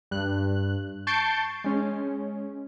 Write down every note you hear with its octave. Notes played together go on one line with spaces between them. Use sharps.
G2 F#6
A5 C#6 G6 A6 C7 D7
G#3 C#4